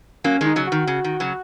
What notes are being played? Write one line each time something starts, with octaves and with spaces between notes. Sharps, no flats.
F#3 A#3 C#4
D#3 G#3
D#4
C#3 F#3
D#3 F#4
C#3
D#3
C#3 F#3